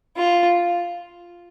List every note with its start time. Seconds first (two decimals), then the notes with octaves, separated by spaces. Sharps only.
0.16 F4